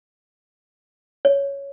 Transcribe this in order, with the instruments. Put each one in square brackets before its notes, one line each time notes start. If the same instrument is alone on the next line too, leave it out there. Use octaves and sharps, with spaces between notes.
[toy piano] C#5